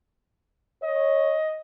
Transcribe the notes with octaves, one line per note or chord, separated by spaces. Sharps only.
C#5 D#5